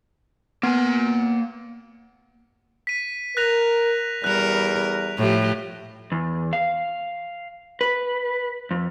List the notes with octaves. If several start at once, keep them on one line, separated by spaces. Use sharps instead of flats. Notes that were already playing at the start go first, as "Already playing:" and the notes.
A#3 B3 G#5
B6 D#7
A#4 F#6 A#6 F7
E2 G3 A#4 F#6 F7
A2 F3 G4
E2
F5
B4
F2